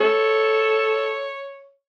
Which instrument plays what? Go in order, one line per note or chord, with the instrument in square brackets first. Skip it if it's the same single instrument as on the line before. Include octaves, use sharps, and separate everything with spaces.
[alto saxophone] A4 [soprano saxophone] C#5